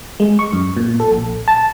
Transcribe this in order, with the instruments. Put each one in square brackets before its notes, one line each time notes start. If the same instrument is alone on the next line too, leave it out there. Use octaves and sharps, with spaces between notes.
[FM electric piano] G#3
C#6
F#2
A#2
A4
A#1
A5